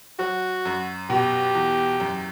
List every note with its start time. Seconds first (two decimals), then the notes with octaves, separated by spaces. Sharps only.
0.19 F#3 F#4
0.65 F#2
1.10 B2 G4
1.55 E2
2.00 F#2